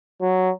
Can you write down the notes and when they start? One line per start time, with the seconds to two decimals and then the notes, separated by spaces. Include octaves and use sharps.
0.21 F#3